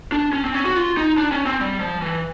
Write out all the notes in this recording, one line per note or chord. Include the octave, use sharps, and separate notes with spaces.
D4
C#4
C4
C#4
F#4
F4
D#4
D4
C#4
C4
G3
F3
E3